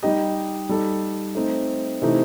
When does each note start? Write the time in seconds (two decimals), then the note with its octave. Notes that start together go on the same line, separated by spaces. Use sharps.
0.03 G3 D#4 G4 D#5
0.69 G3 D#4 A4
1.35 A3 C4 D#4
2.02 C3 E3 A3 D#4